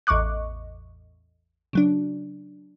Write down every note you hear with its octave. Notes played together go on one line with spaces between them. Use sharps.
A1 E2 D#5 C#6 D6 F#6
C#3 F#3 D4